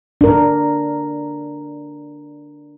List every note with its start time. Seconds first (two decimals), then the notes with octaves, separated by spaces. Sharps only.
0.21 D4 A#4